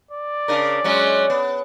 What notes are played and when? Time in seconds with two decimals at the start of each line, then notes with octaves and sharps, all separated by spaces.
0.11 D5
0.48 C#3 D4 A#4
0.84 F#3 G#3 C#4
1.30 B3